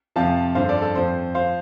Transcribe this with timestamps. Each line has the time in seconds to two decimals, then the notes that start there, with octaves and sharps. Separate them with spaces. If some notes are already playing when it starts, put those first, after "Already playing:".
0.16 F2 C3 F3 F5 A5
0.55 G2 D3 F3 C5 F5
0.69 A4 D5
0.82 A4
0.95 F2 F3 C5
1.35 F3 C5 F5